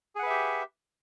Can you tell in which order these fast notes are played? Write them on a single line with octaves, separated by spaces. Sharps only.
G#4 F#5 B4 E5 G4